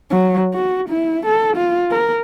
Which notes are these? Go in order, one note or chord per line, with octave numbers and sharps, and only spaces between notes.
F#3
F#4
E4
A4
F4
A#4